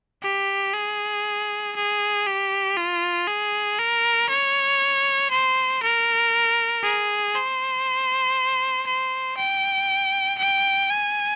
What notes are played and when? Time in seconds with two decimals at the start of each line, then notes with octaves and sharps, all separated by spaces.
0.23 G4
0.74 G#4
1.76 G#4
2.27 G4
2.77 F4
3.27 G#4
3.79 A#4
4.29 C#5
5.30 C5
5.82 A#4
6.83 G#4
7.35 C5
8.86 C5
9.37 G5
10.38 G5
10.90 G#5